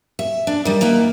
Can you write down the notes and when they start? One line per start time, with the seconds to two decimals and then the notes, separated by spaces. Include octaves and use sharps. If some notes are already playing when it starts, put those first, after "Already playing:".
0.19 E5
0.47 D4
0.65 D#3 G3
0.81 A#3 D#4 E4 B4